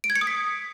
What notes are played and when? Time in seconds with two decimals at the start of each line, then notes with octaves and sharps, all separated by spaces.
0.04 D7
0.10 G#6
0.16 C#7
0.21 D#6
0.27 B6